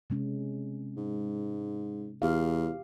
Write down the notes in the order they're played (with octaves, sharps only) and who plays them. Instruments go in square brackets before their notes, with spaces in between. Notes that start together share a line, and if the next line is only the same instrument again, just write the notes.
[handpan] C3 G#3 C#4
[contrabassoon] G#2
[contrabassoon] E2 [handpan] G4 F5